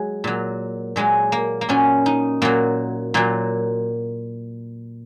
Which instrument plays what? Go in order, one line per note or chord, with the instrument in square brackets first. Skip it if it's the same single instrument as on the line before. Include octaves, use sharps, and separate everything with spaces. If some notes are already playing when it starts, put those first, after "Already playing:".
Already playing: [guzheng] F#3 G#3
A#2 F#3
A#2 F#3 G#3
A#3
A#3
A#2 F#3 C#4
D#4
A#2 F#3 A#3
A#2 F#3 A#3